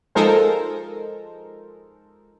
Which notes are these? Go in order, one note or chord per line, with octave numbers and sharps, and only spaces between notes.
F3 G#3 D#4 A4 A#4 C5